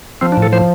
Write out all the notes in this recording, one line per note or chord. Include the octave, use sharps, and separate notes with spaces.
F3 C4
D4
A2
A4
F3 C5